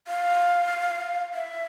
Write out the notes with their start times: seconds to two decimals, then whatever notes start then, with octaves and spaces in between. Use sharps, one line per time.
0.08 F5
1.34 E5